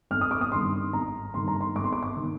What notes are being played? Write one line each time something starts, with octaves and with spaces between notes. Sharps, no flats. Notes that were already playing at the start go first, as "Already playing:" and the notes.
G#1 F6
D#6
D6
D#6
G2 D#3 C6
G#1 A#5
G2 D#3 C6
A#5
C6
G#1 D6
C6
D6
D6
D#3